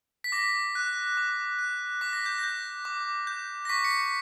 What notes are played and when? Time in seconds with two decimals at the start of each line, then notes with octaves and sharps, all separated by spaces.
0.24 B6
0.32 D6 A#6
0.75 F#6
1.17 D6
1.59 F#6
2.01 D6 B6
2.13 A#6
2.26 G6
2.38 G6 A#6
2.85 D6
3.27 G6
3.65 A#6
3.69 C#6 B6
3.84 C#7
3.91 B6